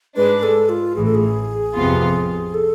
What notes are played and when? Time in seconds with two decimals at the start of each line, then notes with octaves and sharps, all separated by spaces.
0.16 G#2 G#3 D4 B4
0.43 A4
0.69 F4
0.95 A1 A2 E3 G#4
1.05 A4
1.15 G#4
1.75 F2 C3 F3 B3 F4
2.54 A4